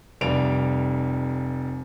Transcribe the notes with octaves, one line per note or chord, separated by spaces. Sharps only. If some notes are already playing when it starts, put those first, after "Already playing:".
F1 G3 D7 F7